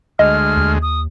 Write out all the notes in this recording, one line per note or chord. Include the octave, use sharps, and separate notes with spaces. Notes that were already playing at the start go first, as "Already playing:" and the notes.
D2 G#3 D#5 F6
D#2
D#6